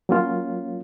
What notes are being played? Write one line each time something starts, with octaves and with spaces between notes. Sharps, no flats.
F#3 A#3 C#4 F4